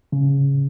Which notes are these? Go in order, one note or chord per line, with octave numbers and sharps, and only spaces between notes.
C#3